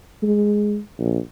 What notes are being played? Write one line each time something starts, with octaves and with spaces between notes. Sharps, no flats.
G#3
A#1